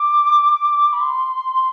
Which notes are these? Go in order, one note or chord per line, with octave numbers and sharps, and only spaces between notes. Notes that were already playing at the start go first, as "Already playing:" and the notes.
Already playing: D6
B5
C6